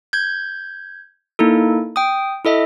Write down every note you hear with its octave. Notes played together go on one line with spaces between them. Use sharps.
G6 G#6
A#3 D#4 E4 A4
G5 D#6
E4 A4 D#5 E5